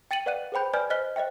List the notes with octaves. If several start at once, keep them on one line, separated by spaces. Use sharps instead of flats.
G5 A6 C#7 D#7 F#7
B4 D5 F5 F#5 F#6 D#7
G#4 B4 C5 G5 B5 G6
B4 D5 G#5 B5 F6 G6
C5 D#5 F6 F#6 B6 G7
C5 D#5 E5 G5